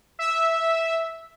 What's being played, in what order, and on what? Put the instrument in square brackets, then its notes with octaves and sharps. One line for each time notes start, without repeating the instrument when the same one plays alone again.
[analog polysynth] E5